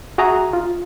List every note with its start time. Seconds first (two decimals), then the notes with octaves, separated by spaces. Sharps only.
0.18 F#4 G#4 E5 A#5 D#6
0.53 F4